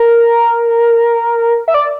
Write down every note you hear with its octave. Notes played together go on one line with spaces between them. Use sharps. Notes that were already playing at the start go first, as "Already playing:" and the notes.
Already playing: A#4
E5
D5